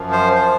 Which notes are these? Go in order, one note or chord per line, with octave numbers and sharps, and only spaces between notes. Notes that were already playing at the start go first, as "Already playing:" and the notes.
Already playing: F#2 F3
C5
C5